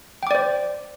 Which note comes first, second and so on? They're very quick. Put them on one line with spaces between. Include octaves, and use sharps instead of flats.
G5 D6 D5 C5